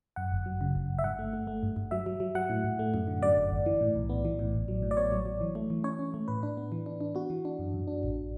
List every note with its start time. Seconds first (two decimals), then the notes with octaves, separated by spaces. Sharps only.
0.16 F#2 F#5
0.32 G1
0.46 F#3
0.61 C#3
0.75 G1
0.89 G1
0.99 E5
1.04 G2 F#5
1.19 A3
1.33 A3
1.47 A3
1.63 G2
1.76 G2
1.91 F#3 E5
2.06 F#3
2.20 F#3
2.35 F#3 F#5
2.50 A2
2.64 A2
2.79 A3
2.94 F#2
3.08 D3
3.22 F#2 D5
3.37 G1
3.51 G1
3.66 E3
3.81 A2
3.95 B1
4.09 B3
4.25 E3
4.39 A2
4.54 A1
4.68 F#3
4.82 A2
4.91 D5
4.97 B3 C#5
5.12 F#3
5.26 F#3
5.41 E3
5.55 A3
5.70 E3
5.84 C#4 C#5
5.99 C#4
6.14 A3
6.28 A2 B4
6.43 D4
6.57 B3
6.72 E3
6.86 D4
7.01 D4
7.15 B3 F#4
7.30 E3
7.45 D4
7.59 F#2
7.74 F#2
7.87 D4
8.03 A1